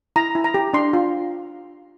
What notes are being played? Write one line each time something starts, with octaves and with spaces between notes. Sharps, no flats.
E4 A#5
E4
A#5
G4
D4 C6
F4